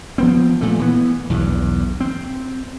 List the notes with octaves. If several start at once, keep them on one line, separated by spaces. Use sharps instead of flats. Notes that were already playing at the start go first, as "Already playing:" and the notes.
F3 B3 C4
A#2 A3
E3 B3
B1 E2 G2
C4